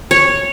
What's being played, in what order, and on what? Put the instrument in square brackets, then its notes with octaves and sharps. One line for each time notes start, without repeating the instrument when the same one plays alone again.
[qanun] C#5